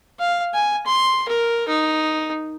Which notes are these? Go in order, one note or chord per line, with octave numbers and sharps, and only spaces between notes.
F5
G#5
C6
A#4
D#4